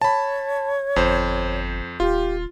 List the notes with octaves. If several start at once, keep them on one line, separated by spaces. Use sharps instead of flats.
C#5 A5 B5
G1 F2 C5
D#1 F4 G4